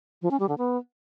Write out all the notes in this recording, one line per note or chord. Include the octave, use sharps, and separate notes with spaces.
F3
C#4
G3
D3
B3